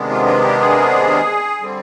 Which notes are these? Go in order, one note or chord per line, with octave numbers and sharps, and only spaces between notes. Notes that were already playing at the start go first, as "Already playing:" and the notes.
Already playing: C3 D#3 G#3 B3 D4
F4
F4
G4
G#4
D3 G3 C4